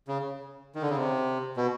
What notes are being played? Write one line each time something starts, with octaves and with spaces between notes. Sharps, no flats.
C#3
D#3
D3
C#3
C3
B2